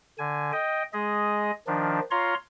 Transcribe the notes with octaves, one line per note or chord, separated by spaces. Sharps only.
D3 G#5
D#5 G5
G#3 G#4 D#5
D#3 F3 D4
F4 C#5 F5 A#5 C6